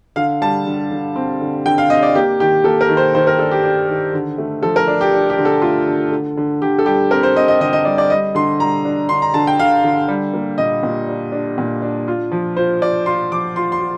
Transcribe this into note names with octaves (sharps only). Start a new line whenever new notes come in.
D3 F5
G3 A5
D3
D3
C4
D3
D3 G5
F5
C4 D#5
D5
A#3 G4
D#3 G4
A#3 A4
A#4
D#3
C5
D#3 C5
A#4
D4 A4
G4
D4 G4
D#3
D3
A3
F3 A4
A#4
D4
G4
D4
G4
D3
A4
A3 F4
D3
D3
D3
D3 G4
A4
G3 G4
C4 A#4
C5
C4 D#5
D#5
D3 D#5
D#5
G3 D5
D5
G3 D#5
D3 C6
G3 A#5
D4
D3 C6
A#5
D3 A5
G5
D3 F5
D3
G3
A#3
A#2 D#5
A#2
D4
D4
A#2
D4
F4
F3
F4 C5
F4 D5
F4 C6
F3 D6
F4 C6
C6
F4